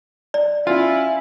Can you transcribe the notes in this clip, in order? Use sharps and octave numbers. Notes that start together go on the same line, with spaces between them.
D5
C#4 E4 F4